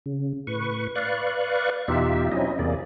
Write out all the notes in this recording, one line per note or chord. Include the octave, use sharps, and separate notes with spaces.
C#3
A2 B4 C#6
B4 D5 F5 C#6 F#6
E2 B2 D#4 F4 G4 E5
F#3 C4 C#4 D#4 E4 D#5
E2 C3 A#3 G#4 D5